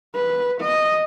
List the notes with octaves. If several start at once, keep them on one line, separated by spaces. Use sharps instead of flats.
B4
D#5